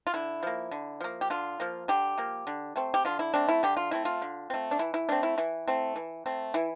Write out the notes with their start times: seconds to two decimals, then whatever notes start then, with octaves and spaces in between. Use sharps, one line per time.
0.07 F4
0.14 D3 E4
0.43 F3 A#3
0.71 D3
1.01 F3 A#3
1.21 G4
1.30 D3 F4
1.60 F3 A#3
1.88 D3 G4
2.18 F3 A#3
2.47 D3
2.76 A3 C4
2.94 G4
3.05 D3 F4
3.19 E4
3.34 A3 C4 D4
3.49 E4
3.63 D3 G4
3.77 F4
3.91 A3 C4 E4
4.05 F4
4.22 D3
4.50 A3 C4
4.71 D4
4.79 E3 E4
4.94 E4
5.09 A3 C4 D4
5.23 E4
5.38 E3 E4
5.68 A3 C4
5.96 E3
6.26 A3 C4
6.54 E3 E4